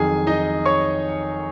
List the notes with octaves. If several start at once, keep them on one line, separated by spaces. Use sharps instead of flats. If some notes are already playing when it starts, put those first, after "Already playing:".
Already playing: F2 D#3 F#3 G#4 G#5
D#4 D#5
C#5 C#6